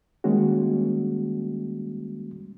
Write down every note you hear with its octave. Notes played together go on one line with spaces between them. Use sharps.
D#3 G3 G#3 A#3 C#4 F#4